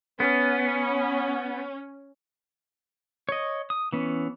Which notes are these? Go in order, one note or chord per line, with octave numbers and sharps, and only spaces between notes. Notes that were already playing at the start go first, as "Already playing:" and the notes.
B3 C#4
C#5 D#5
D#6
E3 B3 C#4